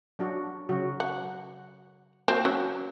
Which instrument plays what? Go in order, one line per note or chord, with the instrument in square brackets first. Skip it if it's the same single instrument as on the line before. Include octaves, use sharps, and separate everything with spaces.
[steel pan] F#3 D4 F#4
C#3 F#3 F#4
[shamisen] F#5
[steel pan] A#3 F#4 [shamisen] C4
[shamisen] F#3 [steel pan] C#4